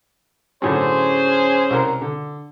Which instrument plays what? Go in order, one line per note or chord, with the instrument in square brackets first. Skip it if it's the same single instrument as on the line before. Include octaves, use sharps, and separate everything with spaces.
[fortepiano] F#2 A2 D3 [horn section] C#4 G#4 C5
[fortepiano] C2 A#4
D3